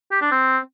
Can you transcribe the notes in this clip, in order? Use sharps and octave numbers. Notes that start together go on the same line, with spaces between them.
G4
D4
C4